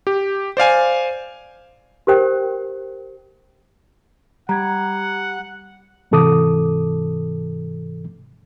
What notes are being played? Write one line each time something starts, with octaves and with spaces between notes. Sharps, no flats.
G4
C5 D5 F5 G#5
G4 A#4 C5 G5
G3 F#5 A#5 G#6
G#2 C3 E3 A4 D6 D#6